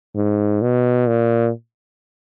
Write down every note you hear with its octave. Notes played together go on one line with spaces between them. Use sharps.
G#2
B2
A#2